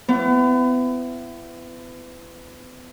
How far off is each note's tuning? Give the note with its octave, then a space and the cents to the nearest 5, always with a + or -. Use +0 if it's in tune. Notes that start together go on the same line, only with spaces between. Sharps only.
B3 +35 E4 +30